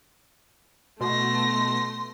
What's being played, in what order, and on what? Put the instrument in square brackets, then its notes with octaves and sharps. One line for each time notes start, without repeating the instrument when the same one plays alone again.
[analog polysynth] B2 [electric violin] A3 A#6 [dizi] C6